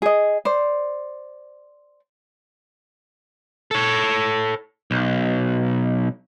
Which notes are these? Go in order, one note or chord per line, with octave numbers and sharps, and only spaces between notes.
G#4 D#5
C5 D5
A4 C#5
B1